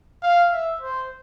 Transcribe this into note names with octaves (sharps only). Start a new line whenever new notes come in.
F5
E5
C5